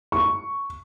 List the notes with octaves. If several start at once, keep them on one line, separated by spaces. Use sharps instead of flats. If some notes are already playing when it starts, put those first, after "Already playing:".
C#6